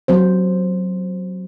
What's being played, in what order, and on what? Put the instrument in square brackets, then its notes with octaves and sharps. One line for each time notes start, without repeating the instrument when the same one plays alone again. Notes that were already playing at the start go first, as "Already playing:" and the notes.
[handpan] F#3 C4 C5